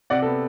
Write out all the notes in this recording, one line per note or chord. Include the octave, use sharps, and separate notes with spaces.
C3 D5 F#5
B3 A4